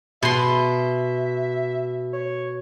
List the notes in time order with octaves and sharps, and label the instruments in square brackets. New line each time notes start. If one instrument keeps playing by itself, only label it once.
[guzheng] B2 C6 [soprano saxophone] E5
[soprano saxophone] C#5